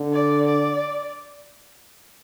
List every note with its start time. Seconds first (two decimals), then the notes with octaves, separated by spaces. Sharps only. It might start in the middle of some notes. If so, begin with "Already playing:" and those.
Already playing: D3
0.13 D5
0.47 D5